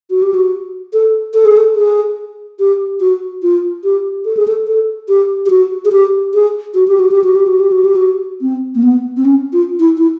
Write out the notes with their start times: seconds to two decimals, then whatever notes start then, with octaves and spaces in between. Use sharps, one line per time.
0.10 F#4
0.22 G4
0.34 F#4
0.93 A4
1.34 A4
1.45 G#4
1.57 A4
1.76 G#4
2.59 G4
3.00 F#4
3.43 F4
3.84 G4
4.25 A4
4.37 G#4
4.48 A4
4.67 A4
5.08 G4
5.46 G4
5.50 F#4
5.85 G#4
5.92 G4
6.34 G#4
6.74 F#4
6.88 G4
6.99 F#4
7.11 G4
7.24 F#4
7.35 G4
7.47 F#4
7.60 G4
7.72 F#4
7.85 G4
7.96 F#4
8.41 C4
8.75 A#3
8.83 B3
9.17 C4
9.25 C#4
9.53 F4
9.79 E4
9.98 E4